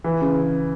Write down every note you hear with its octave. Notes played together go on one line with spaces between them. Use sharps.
E3
C#3